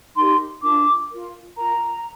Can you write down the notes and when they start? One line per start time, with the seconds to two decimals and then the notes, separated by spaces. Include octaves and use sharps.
0.15 D#4 G4 A#4 C6
0.62 D4 F4 A#4 D6
1.11 F4 A#4
1.57 F4 A#4 A#5